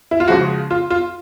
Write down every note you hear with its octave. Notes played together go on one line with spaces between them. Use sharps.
E4
F4
C#3 F3 G#3 F#4
F4
F4